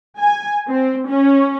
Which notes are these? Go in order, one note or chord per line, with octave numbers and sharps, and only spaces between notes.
G#5
C4
C#4